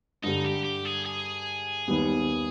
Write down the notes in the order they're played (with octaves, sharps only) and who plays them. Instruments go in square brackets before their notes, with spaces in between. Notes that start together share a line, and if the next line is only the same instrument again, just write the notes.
[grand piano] G2 D3 G3 [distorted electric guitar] D#4
[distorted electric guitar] G4
G4
G#4
G#4
[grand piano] D#2 D#3 G3 B3